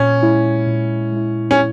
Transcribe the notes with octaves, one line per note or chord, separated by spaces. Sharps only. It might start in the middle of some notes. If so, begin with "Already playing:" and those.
Already playing: A#2 C#4
G#3 E4
A#2
G#3 E4
C#4